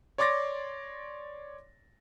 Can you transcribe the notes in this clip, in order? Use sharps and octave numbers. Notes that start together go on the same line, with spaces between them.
C#5 D5 C6 D6 A6 A#6